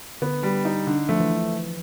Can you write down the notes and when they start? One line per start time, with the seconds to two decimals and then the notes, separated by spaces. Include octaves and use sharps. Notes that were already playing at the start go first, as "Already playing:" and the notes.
0.22 D3 B3
0.43 G3
0.65 D#4
0.87 D3
1.09 F3 A3
1.20 E3